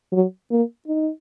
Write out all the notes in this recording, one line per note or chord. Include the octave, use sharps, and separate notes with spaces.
F#3
A#3
D#4